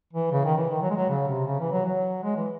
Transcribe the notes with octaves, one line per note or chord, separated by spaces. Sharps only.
E3
C#3
D#3
E3
D#3
F#3
G#3
F#3
C#3
C3
C#3
E3
F#3
F#3
G#3
E3